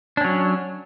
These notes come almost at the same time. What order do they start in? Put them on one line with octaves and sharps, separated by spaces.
D4 C#4 F#3